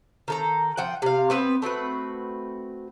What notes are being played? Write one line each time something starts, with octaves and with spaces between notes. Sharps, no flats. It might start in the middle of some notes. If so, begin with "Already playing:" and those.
D#3 A4 A#5
F3 F#5 G5
C3 F5
B3 C4 B4
A3 C4 F#4 B4